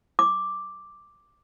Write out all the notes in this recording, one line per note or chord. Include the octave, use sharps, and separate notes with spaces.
D6